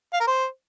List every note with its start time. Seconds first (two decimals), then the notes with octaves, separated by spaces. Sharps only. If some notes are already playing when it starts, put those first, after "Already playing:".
0.13 F5
0.20 A#4
0.27 C5